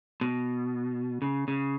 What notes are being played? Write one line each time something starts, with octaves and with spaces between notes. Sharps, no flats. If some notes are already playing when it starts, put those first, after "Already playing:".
B2
C#3
C#3